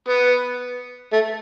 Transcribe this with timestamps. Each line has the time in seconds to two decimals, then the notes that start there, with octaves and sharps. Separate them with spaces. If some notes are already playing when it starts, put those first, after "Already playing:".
0.08 B3
1.12 A3